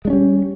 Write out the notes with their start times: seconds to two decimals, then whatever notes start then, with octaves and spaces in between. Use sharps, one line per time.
0.05 G#3
0.07 D4
0.10 C#4
0.13 G3